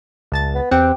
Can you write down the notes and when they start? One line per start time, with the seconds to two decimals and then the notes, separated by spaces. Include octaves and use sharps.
0.32 C#2 A5 A6
0.54 B3
0.71 E2 C4 G4 F#5